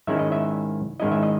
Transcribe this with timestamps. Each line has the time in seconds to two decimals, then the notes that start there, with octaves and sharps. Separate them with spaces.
0.07 G#2 D#3 G#3 C#4 E4 E5
0.19 D#5
0.32 E5
1.00 G#2 D#3 G#3 C#4 E4 D#5
1.12 E5
1.23 D#5